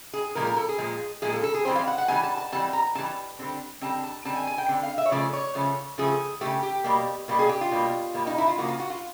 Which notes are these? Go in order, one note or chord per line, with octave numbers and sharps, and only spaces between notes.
G#4
A#2 F3 G#3 A#4
A#4
A4
G#4
A#2 F3 G#3
A#2 F3 G#3 G#4
A4
A4
G#4
E3 G3 C4 C5
F5
F#5
F#5
E3 G3 C4 G#5
A5
A5
E3 G3 C4 A5
A#5
E3 G3 C4 A5
D3 G3 C4
D3 G3 C4 A5
A5
D3 G3 C4 A5
G#5
G#5
G5
D3 G3 C4
F5
E5
C#5
C#3 F3 A3 D5
C#5
C#3 F3 A3
C#3 F3 A3 G#4
C#3 F3 A3 G4
G4
B2 G3 A#3
B2 G3 A#3
G#4
G4
F4
B2 G3 A#3
B2 G3 A#3
D#4
E4
F4
C#3 F3 A#3 F#4
F4
F#4
F4